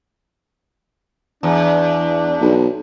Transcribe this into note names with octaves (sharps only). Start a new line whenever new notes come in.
E2 D4
B1